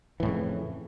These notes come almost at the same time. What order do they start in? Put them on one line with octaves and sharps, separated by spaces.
E3 A2 F2 C#3